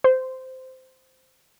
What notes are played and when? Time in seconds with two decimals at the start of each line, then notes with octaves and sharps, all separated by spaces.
0.04 C5